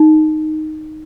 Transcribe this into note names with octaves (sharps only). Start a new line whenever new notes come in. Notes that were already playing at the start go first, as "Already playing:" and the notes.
Already playing: D#4